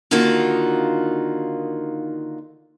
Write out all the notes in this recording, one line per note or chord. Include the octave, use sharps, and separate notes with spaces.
D3 D#3 A#3 D#4 F4 F#4